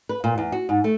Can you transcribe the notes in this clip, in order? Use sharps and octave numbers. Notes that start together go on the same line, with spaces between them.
B4
A#2
E2
F#4
G#2
A3